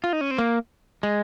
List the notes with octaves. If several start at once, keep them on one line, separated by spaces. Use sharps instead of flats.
F4
D#4
C#4
C4
A#3
G#3